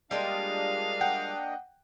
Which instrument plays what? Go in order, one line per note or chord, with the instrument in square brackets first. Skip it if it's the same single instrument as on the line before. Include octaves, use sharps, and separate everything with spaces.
[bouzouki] G3 G#3 F4 [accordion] A#3 D4 D#5 [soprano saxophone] F5
[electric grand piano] F#5 G5